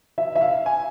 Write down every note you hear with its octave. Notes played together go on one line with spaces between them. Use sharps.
E5
E5
F5
G#5